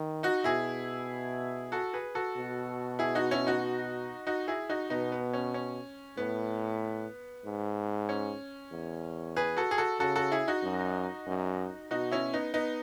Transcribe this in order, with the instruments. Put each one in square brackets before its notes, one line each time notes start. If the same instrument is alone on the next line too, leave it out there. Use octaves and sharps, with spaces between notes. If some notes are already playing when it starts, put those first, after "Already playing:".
Already playing: [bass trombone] D#3
[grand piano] D#4 F#4
[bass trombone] B2 [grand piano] E4 G#4
[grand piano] F#4 A4
G#4 B4
F#4 A4
[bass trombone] B2
[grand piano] E4 G#4
D#4 F#4
C#4 E4
D#4 F#4
D#4 F#4
E4 G#4
D#4 F#4
[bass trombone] B2 [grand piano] B3 D#4
[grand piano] B3
C#4
C#4
[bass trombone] A2 [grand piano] B3
[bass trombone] G#2
[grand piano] C#4
[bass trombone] E2
[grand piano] G#4 B4
F#4 A4
G#4
F#4 A4
[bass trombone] C#3 [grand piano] F#4 A4
[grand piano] F#4 A4
E4 G#4
D#4 F#4
[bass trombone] F#2
F#2
[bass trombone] B2 [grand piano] D#4 F#4
[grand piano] C#4 E4
B3 D#4
B3 D#4